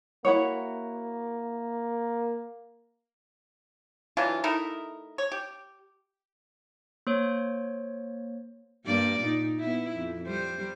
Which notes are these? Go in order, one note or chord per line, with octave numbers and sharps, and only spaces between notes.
A#3 E4 F#4 C#5
E3 F#3 D4 F4
A3 D#4 E4 A#4
C#5
G4
A#3 C5 C#5
G2 A#3 D5
A#2 D#4
B3 E4
F2
G3 C5